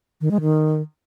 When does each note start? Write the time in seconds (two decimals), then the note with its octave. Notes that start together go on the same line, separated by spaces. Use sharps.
0.21 D#3
0.31 G#3
0.41 D#3